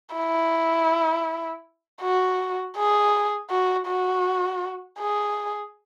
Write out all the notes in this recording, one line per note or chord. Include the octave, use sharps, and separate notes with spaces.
E4
F#4
G#4
F#4
F#4
G#4